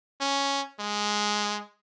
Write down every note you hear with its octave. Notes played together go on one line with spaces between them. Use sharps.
C#4
G#3